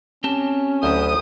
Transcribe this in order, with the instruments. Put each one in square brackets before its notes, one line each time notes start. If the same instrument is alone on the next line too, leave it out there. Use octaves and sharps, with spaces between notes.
[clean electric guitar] C4 G4 A5 [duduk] C#4
[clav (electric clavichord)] D2 F#3 G4 [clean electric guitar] E4 C5 [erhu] D#6